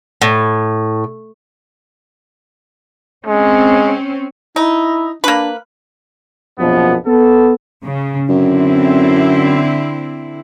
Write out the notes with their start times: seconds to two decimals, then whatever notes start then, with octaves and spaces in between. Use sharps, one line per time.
0.22 A2
3.26 G#3 C4 C#4
4.56 D#4 E4
5.24 A#3 D4 B4
6.59 A#1 F#2 B2 F3 B3
7.06 B3 A4
7.85 C#3
8.29 F#2 D3 C4 E4